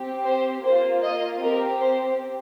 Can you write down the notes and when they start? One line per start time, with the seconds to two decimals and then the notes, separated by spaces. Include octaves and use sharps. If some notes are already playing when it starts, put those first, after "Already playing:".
Already playing: C4 G4
0.25 C5
0.64 A#3 F4 C5
1.04 D#5
1.43 C4 G4 A#4
1.82 C5